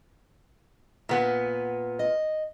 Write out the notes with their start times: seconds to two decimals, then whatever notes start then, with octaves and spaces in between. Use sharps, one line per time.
1.09 A#2 B3
1.99 D#5